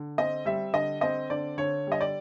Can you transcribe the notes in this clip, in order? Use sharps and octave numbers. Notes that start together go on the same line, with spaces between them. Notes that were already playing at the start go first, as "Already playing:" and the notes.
Already playing: D3
C4 D#5
G3 E5
D3 D#5
C4 D#5
D3 D5
D3 C#5
G3 D#5
D5